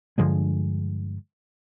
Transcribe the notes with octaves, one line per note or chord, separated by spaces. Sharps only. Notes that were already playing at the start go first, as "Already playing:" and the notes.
G2 D3 F3 G#3